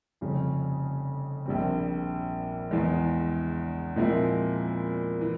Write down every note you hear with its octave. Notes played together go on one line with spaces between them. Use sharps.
F1 F2 C#3 G3 C#4
A#1 A#2 G3 C4
E2 E3 G#3
A#2 F3 G#3 C4 E4
E3